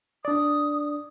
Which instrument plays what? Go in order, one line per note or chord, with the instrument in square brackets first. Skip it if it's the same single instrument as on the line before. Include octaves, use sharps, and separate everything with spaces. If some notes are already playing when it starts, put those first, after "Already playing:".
[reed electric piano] D4 D5 [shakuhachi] D#6